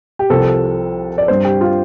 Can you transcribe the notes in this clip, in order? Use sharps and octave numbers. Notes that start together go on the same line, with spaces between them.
G4
C2 C3 F3 C4 A4
D5
G2 G3 C4 C5
G4
F4